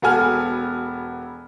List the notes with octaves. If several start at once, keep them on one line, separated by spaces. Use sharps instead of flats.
E1 B3 F#4 A4 G#5 F6